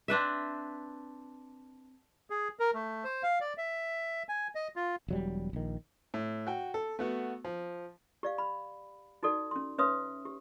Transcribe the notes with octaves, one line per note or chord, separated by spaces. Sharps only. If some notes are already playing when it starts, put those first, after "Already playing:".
C4 D4 B4 E5
G#4
A#4
A3
C5
F5
D5
E5
G#5
D#5
F4
E1 F#3 G3
A#1 D#3
A2
F#4 G5
A4
A3 B3 F#4
F3
G4 D5 F5
B5
D#4 F#4 A4 D5
C#4 C6
C#4 B4 C#5 E5 C6 D#6
G4